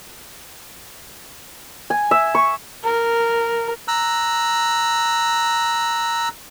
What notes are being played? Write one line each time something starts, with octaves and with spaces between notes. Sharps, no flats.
G#5
E5
C#6
A#4
A#5 E6 F#6